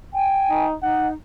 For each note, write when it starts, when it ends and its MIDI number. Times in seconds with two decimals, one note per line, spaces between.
0.13 0.64 79
0.13 0.64 80
0.50 0.76 63
0.83 1.13 63
0.83 1.09 78